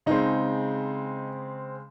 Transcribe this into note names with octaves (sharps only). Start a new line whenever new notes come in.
C#3 G#3 C4 D#4